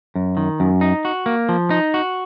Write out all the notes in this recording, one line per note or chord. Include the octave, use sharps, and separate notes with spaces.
F#2
D#3
F#2
D#4
F#4
A#3
F3
D#4
F#4